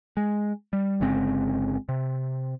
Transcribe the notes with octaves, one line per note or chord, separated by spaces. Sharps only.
G#3
G3
G1 C#3 G#3 C4
C3